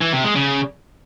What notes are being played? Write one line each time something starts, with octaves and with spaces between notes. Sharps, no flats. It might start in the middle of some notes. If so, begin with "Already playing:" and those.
E3
C3
G#3
C#3